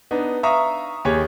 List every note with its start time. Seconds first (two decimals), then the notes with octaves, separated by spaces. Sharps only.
0.11 B3 D4 D#4
0.43 E5 F5 A#5 C#6 D#6
1.05 D#2 G4 G#4 C#5